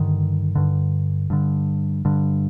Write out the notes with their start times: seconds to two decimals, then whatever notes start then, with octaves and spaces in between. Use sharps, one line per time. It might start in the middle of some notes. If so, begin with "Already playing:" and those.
Already playing: G2 D3 D#3
0.55 G2 D3
1.30 G2 D3
2.05 G2 D3